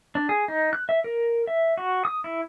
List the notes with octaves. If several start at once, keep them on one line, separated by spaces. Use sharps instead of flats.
D4
G#4
D#4
F#6
E5
A#4
E5
F#4
D#6
E4